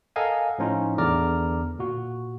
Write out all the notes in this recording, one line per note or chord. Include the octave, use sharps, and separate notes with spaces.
A4 A#4 D#5 F5 F#5 G#5
A2 F3 C#4 D#4 F4
E2 D3 D5 A#5 D6 F6
A#2 F#4